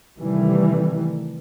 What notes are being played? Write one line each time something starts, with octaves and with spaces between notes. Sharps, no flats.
C3 D#3 E3 G3 A3